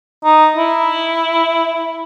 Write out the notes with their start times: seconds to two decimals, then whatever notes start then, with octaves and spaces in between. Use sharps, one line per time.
0.25 D#4
0.57 E4